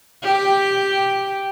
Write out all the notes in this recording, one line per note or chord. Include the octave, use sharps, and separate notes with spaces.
G4